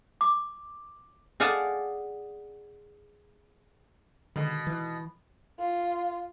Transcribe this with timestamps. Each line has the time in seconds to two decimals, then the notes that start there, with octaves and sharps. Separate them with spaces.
0.21 D6
1.40 G#4 D5 F5 F#5 G#5 A5
4.36 B2 D3 D#3 G#3
4.67 E3
5.59 F4